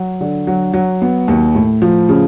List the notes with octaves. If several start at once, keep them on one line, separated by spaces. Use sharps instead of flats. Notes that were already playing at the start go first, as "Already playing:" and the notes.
Already playing: F#3
D3
F#3
F#3
B3
D#2
A2
F3
C#3